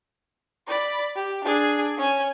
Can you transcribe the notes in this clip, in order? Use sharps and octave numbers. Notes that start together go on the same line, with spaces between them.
D5 B5
G4
D4 G#4
C#4 G#5